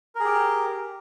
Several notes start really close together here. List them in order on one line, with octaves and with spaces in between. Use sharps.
A#4 G#4 G4